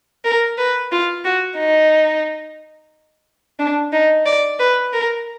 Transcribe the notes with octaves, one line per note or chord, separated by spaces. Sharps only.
A#4
B4
F4
F#4
D#4
D4
D#4
D5
B4
A#4